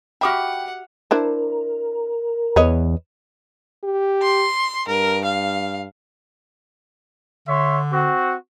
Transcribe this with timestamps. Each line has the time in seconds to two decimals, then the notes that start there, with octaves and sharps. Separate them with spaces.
0.21 F#4 G4 E5 F#5 G5 B5 D6 F6
1.11 D4 E4 A#4 C5
2.56 E2 B4 C#5 D#5
3.84 G4
4.22 C6
4.88 G2 A#4
5.25 F5
7.48 D3 C#5 E5 C6
7.91 C4 F#4